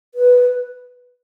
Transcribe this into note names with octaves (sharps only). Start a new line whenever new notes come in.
B4